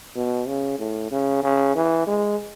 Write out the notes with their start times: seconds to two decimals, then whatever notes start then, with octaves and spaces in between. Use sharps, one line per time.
0.16 B2
0.48 C#3
0.79 A2
1.12 C#3
1.43 C#3
1.75 E3
2.07 G#3